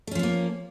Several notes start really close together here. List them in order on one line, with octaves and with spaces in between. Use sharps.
A3 C#4 F3 C4 A#3